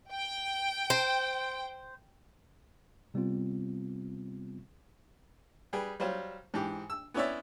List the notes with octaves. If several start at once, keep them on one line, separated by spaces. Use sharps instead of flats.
G5
C5
C3 G3 B3 C4 F4
G3 G#4 B4 G5
F#3 G3 F4 C5
G#2 E3 G4
E6
B3 C#4 E4 C#5 D5 E5